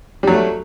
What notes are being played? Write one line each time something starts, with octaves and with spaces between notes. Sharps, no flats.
F#3 G3 A3